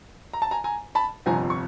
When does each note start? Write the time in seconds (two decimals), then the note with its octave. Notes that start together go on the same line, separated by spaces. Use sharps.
0.33 A#5
0.42 A5
0.51 G#5 A#5
0.64 G#5 A#5
0.95 A5 B5
1.26 G1 F2 C3 F3 G#5 A#5
1.50 C#6